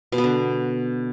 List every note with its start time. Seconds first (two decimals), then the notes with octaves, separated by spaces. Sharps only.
0.12 B2
0.18 B3
0.24 D3